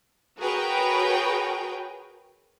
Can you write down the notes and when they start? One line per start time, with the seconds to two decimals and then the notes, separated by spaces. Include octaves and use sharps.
0.39 F#4 G#4 A#4 B4 C#5 G5